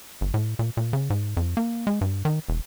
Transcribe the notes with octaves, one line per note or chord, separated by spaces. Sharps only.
G1
A2
A#2
A#2
C#3
G#2
F2
A#3
G#3
G2
D#3
E1